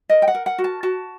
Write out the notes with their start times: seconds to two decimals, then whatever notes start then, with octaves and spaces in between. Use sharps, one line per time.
0.09 A#4 D#5
0.22 G5
0.28 F#5
0.35 A#4
0.46 F#5
0.58 F#4
0.64 A5
0.83 F#4 A5